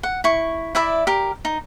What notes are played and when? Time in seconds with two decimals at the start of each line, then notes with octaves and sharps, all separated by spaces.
0.03 F#5
0.24 E4 C#6
0.75 E4 D5 E5 B5
1.07 G4 A#4
1.45 D#4